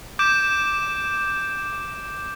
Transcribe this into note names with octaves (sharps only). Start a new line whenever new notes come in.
D6 G6 D7 E7